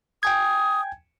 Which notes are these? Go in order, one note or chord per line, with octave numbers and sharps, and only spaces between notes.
G5 G#5 D#6 G#6